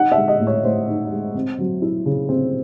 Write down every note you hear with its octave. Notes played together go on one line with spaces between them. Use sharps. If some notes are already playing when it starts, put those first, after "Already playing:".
Already playing: D#4 F#5
E5
G#3
D#5
A2
C#5
A2 C5
D#4
G#3
C4
F#3
E4
C#3
C4